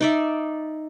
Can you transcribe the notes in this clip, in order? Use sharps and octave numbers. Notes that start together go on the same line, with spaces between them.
D#4 D5 E5